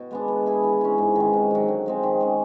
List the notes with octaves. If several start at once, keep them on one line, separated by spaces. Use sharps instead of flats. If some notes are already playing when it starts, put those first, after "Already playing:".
Already playing: B2
G#3 B3 D4
B3
E4 G#4
E3
G#3 C#4
G#2
D#3 G#3
C3
D#3 F#3
D3
F3 G#3 C4
D#3
G#3 C#4